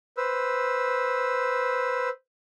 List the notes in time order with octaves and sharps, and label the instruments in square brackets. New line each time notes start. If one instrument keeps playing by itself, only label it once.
[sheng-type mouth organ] B4 C5 E6